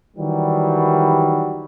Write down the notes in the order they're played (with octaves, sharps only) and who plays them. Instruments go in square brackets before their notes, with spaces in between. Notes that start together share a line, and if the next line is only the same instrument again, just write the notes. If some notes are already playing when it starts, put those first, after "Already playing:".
[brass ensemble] D#3 E3 F#3 G3